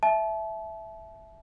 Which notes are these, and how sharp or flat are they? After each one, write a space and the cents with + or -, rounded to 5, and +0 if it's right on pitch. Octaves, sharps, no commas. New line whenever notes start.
E5 +0 A5 -35